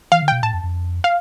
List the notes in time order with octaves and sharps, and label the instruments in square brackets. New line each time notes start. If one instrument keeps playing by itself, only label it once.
[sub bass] E3 [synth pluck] F5
[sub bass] D3
[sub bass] B2 [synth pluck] G5
[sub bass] A2 [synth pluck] A5
[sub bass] F2
F2
[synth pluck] F5